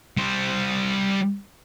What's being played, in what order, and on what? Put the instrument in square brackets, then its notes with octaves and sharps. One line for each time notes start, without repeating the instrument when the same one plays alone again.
[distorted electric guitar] G3 C5